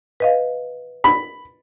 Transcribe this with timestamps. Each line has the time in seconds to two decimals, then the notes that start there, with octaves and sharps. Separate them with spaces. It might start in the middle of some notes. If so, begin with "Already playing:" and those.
0.20 B4 D#5 F5
1.04 B5